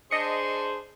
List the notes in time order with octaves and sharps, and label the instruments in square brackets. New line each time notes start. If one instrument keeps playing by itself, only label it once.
[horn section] D4 G#4 C5 [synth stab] D#5 C#7